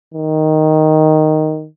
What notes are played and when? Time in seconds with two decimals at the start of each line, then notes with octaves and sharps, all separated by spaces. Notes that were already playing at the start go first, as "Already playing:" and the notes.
0.14 D#3